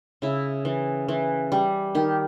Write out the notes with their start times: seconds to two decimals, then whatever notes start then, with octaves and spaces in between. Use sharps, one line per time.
0.22 C#3 E4
0.65 E3
1.08 E3
1.52 G3
1.95 D#3 G4